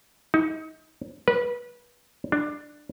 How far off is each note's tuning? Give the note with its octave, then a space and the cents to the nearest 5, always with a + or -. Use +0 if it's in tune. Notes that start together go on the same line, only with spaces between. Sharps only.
D#4 +30
B4 -25
D4 +15